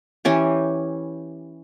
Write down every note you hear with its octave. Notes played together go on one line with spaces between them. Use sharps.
E3 C#4 G4